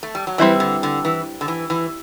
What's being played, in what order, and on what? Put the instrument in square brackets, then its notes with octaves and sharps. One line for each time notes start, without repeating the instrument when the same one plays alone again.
[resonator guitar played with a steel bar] A3
G3
F#3
[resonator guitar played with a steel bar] E3 [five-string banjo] G3 C4 E4 B4
[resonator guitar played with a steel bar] D3
D3
E3
D3
E3
E3